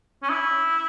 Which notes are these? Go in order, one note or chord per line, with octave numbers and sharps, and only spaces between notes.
C#4
E4